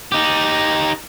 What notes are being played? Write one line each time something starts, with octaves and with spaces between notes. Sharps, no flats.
D#4 G4